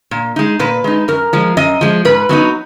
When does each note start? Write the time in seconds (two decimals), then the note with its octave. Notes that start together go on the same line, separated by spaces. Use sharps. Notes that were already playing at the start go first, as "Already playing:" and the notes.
0.11 A#2
0.36 G#3 D#4
0.59 A#2 B4
0.84 G#3 D#4
1.08 F#2 A#4
1.33 F3 G#3
1.57 F#2 D#5
1.81 F3 G#3
2.05 G#2 B4
2.29 F#3 B3 D#4